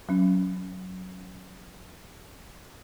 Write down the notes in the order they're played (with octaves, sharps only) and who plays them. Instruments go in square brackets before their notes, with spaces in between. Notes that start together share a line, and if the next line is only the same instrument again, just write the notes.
[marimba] F#3 C#4